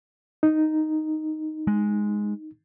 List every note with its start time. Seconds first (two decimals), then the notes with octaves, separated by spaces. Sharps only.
0.43 D#4
1.67 G#3